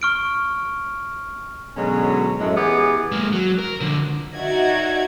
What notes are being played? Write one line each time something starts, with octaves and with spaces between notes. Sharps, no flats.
C#6 F6 D7
B2 D3 F#3 G#3 C#4
F#2 A2 G#3 A3
E3 B3 G4 G#4
G#3 A#3
F#3
A#4
D3 F3
D#4 F#4 D5 E5 G#6